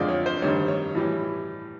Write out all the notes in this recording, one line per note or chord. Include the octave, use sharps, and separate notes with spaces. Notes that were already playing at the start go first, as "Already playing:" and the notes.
Already playing: F2 D3 F3 G#3 D5
C#5
C5
G2 D#3 G3 C#5
C#5
A2 E3 G3